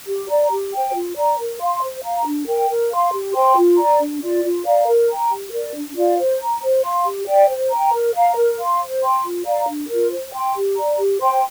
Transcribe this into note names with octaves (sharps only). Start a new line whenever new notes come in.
G4
D5 A#5
G4
C5 G5
F4
D5 A#5
A#4
F5 C6
C5
F5 A#5
D4
A#4 G5
A#4
F5 C6
G4
C5 G5 C6
F4
D5 A#5
D4
F4 D5
F4
D5 F5 A#5
A#4
G5 A#5
G4
A#4 D5
D4
F4 D5 F5
C5
A#5
C5
F5 C6
G4
D5 G5
C5
G5 A#5
A#4
F5 A#5
A#4
F5 C6
C5
G5 C6
F4
D5 F5 A#5
D4
F4 A#4
C5
G5 C6
G4
D5 A#5
G4
C5 G5 C6